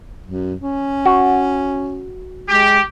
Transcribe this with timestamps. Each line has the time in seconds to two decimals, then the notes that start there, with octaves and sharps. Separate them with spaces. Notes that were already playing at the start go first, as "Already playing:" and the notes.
0.26 F#2
0.61 C#4
1.06 F#4
2.49 G#3 G4